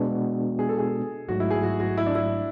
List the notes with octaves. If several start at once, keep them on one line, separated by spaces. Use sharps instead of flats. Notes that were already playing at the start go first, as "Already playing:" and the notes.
Already playing: B2 G#3 B3 D4 F#4
G#4
A4
G#4
A1 G#2 F#3 A3 F#4
E4
G#4
F#4
F#4
E4
D4
E4